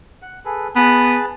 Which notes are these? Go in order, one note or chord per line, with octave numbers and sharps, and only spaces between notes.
F#5
G#4 A4 B4
B3 G#4 B4 A5